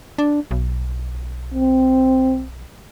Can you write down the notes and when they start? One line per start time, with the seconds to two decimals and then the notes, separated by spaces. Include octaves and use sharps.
0.18 D4
0.51 B1
1.54 C4